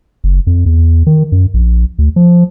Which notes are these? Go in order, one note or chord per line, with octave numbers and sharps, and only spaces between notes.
F#1
F2
E2
D#3
F#2
A#1
D2
F3